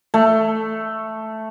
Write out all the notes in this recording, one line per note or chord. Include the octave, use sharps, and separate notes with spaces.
A3